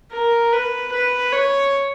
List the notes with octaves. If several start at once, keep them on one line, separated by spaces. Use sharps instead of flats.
A#4
B4
B4
C#5